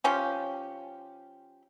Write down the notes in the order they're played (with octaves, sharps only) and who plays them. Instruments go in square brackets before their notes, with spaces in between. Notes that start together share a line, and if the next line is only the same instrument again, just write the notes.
[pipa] F3 C#4 G4